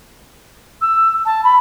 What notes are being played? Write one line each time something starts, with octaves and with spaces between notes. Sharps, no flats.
E6
A5
B5